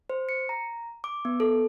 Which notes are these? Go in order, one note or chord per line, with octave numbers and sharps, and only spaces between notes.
C5
C#7
A#5
D6
B3
A4